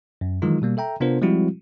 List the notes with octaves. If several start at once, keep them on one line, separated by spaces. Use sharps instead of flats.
F#2
D#3 E3 F#3 G#3 D#4 F4
B2 G3 A#3
A4 E5 G5 A#5
C3 B3 D4 F4 A#4 C5
F3 G3 G#3 C4 E4 F#4